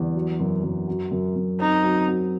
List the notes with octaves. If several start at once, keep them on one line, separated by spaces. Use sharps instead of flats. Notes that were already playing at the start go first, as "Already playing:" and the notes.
Already playing: E2 G3
F#3
F#2
F#2
F#3
F#2
F#2
C4 D#4
F#3
F#3